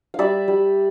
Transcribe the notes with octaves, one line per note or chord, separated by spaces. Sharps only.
G3 D5 E5 F5
G3